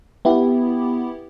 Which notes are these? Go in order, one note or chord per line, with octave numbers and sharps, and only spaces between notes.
B3 E4 G4